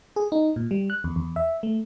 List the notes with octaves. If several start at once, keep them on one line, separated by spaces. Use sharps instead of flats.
G#4
D#4
A#2
G3
F#6
E2
E2
E5
A3